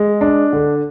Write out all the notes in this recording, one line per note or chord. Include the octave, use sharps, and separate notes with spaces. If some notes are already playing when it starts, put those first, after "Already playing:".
Already playing: G#3
D4
D3